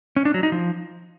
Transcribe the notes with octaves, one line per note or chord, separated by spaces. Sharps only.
C#4
D4
F#3
D#4
F3